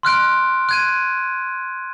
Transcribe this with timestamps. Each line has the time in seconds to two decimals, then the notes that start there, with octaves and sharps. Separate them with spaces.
0.03 C6 F6 F#6 D7
0.69 F#6 G#6 D#7